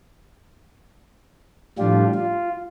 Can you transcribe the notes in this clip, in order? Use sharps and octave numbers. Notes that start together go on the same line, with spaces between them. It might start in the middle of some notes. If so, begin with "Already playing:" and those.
A2 F3 G3 D4 F4 G4
F4